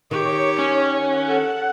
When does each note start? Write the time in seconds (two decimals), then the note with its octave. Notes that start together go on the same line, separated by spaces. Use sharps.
0.11 D#3 G4 C#5 C#6
0.58 C#4
0.95 F#5
1.27 A4